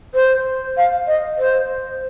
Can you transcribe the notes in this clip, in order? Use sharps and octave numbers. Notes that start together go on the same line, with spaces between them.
C5
F5
D#5
C5